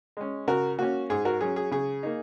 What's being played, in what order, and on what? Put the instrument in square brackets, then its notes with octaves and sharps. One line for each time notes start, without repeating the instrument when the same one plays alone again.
[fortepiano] G#3 C#4
C#3 F#4 A#4
A#3 C#4 F#4
G#2 G#4
F#4 A#4
F#3 C#4 G#4
G#4
C#3 G#4
A#3 D#4